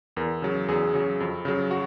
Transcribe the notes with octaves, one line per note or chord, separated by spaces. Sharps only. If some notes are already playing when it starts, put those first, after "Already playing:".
E2 A#4
C#3 F#3
E2 G#4
C#3 F#3
F2
C#3 F#3
F#4